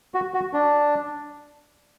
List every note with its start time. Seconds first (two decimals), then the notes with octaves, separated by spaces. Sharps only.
0.14 F#4
0.34 F#4
0.53 D4